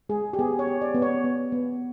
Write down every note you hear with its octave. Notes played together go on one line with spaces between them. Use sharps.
G#3 G#4
G4
B3 G#4
C#5
G4
D5
B3
C#5
B3
B3